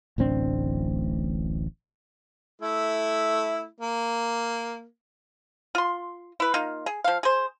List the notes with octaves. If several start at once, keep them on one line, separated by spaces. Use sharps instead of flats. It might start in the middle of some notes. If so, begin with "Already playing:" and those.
D1 A1 C4 D4
A3 E4 E5
A#3
F4 C6
E4 B4
A#3 D#4 F4
G#4
F3 F5
G#4 C5